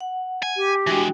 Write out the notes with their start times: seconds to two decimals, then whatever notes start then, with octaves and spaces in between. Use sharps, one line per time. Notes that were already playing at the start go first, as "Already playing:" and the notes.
0.01 F#5
0.43 G#5
0.57 G4
0.87 E3 G#3 D4 F#4 G5